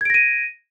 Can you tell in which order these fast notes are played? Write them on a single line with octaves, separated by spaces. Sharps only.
G#6 D7 A#6 D#7